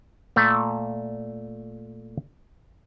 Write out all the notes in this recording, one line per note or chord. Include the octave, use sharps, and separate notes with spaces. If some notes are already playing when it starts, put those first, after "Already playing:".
A#2 A3